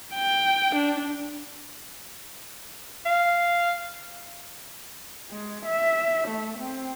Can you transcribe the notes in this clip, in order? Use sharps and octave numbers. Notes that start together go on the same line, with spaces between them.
G5
D4
F5
G#3
E5
A3
C4